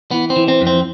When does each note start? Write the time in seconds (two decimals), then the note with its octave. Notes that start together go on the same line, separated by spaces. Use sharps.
0.11 E3 B3
0.30 C4
0.36 E3
0.48 C4
0.61 F2
0.67 C4